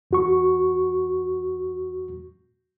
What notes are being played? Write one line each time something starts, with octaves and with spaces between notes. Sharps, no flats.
E2 F#4 C#6